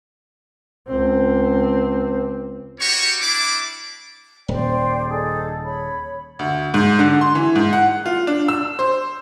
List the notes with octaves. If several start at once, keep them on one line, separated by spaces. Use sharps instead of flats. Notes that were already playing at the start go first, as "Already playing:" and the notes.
C#2 C4
G3 F#4 G4 C#5 C#6
G3 D4 E4 D6
D#1 C5 D5 G5
D#4 G#4 A4
C#5 B5
D2
G#2
D3
C6
E3
G#2
F#5
F4
D4
E6
C5